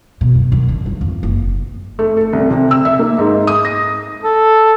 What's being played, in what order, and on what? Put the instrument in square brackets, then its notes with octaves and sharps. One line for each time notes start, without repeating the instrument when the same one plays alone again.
[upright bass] B2
F#2
F#2
D3
F#3
F2
F#1
[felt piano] A3
A4
C2
C3
E6
E5
A#3
G#2
D#6
A#6
[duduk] A4